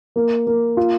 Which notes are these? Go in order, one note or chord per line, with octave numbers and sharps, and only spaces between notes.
A#3
A#3
F4